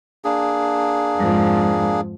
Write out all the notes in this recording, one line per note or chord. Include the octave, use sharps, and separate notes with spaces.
A#3 D4 G#4
F2 G#2 F3